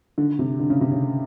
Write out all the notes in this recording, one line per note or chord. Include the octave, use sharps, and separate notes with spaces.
D3
C3
D3
C#3
C3
C#3